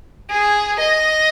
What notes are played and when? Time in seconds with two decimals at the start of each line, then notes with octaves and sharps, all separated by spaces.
0.30 G#4
0.79 D#5